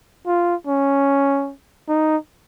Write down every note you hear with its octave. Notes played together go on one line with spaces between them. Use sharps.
F4
C#4
D#4